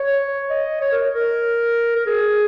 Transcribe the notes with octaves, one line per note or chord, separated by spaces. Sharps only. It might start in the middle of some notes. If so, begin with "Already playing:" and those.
Already playing: C#5
D#5
C#5
A#4
A#4
A#4
G#4